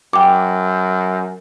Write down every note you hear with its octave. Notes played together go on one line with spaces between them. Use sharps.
F#2 G5 D6